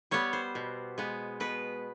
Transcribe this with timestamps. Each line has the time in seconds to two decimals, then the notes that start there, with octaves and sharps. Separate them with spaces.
0.11 G3 B3 C#5
0.33 C5
0.55 B2
0.98 G#3 B3
1.40 B2 B4